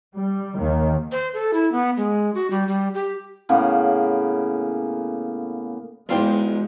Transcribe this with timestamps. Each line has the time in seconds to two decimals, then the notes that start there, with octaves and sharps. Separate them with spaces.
0.14 G3
0.57 D#2 D#3
1.12 C5
1.34 A4
1.53 E4
1.72 B3
1.97 G#3
2.35 F#4
2.50 G3
2.68 G3
2.94 G4
3.49 A2 C#3 A#3 B3
6.09 E2 G#2 F#3 G#3 F4 C5 G5